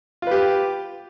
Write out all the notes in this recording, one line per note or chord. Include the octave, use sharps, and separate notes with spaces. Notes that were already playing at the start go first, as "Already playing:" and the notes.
F4 G4 B4